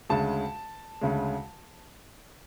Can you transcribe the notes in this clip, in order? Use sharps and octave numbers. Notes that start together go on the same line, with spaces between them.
D2 C#3 G#3 A5
D2 C#3 G#3